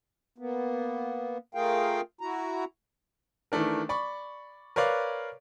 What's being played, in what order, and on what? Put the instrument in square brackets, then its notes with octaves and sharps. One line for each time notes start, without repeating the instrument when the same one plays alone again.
[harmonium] A#3 B3
A3 F4 G#4 A#4 F5 G5
E4 F#4 A#5
[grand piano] D#3 E3 A3 D4 A#4
D5 B5 C#6
A#4 B4 C#5 D5 F5